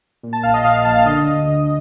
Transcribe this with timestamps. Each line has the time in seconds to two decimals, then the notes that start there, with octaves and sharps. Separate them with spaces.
0.23 A#2
0.33 A5
0.43 A#1 F5
0.54 D#5
0.64 A#2 F5
0.74 F5
0.85 A#1 A5
0.96 F5
1.06 D3 D#5
1.27 D2
1.48 D3